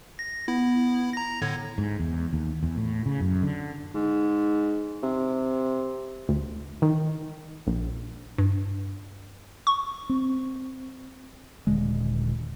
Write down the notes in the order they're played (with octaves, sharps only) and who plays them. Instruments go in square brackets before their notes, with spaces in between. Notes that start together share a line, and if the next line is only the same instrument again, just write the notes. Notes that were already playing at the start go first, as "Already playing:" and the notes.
[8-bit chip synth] A#6
[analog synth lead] B3 [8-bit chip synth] E4
[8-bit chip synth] A#5 A#6
[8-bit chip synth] A2 D3 [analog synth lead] G#6
[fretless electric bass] G#2
E2
D#2
E2
A2
C#3
F#2
D3
[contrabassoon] G#2
C3
[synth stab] D2
D#3
A#1
[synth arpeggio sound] G2
C#6
[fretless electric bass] C4
D#1 D3 G#3